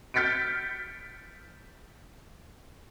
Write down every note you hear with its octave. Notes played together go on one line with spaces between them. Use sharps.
F6 G6 A6 B6 C#7 D7